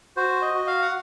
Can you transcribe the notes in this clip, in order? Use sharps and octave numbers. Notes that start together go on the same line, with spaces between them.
F#4 C5
D#5
F#4
F5
F#5